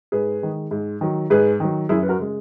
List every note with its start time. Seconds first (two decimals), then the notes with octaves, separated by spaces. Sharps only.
0.12 G#2 G#4 B4
0.42 D#3 G#3
0.71 G#2
1.01 D#3 F#3
1.30 G#2 G#4 B4
1.60 D#3 F#3
1.89 F#2 E4 G#4
2.03 B4
2.09 F#4 A#4
2.19 C#3 G#3